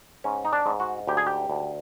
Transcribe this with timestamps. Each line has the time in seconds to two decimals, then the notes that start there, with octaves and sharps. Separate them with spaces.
0.24 G#2 C#4
0.45 D#4
0.53 D4
0.66 G#2
0.80 F#4
1.07 D2 G4
1.17 G#4
1.27 G4
1.50 D2